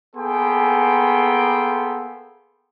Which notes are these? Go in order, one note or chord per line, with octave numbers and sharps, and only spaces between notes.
A#3 B3 G#4 A4 G5 C6